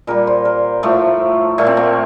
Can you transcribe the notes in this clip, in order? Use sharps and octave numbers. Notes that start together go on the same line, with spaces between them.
A#2 G3 A#4
C5
A#4
A2 F3 A3
A#2 A3
C4
A#3